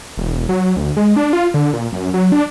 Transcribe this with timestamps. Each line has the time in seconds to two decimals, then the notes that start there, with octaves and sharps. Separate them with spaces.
0.17 E1
0.49 F#3
0.76 D2
0.97 G#3
1.16 D4
1.33 F4
1.54 D3
1.73 A#2
1.92 F#2
2.14 F#3
2.32 D4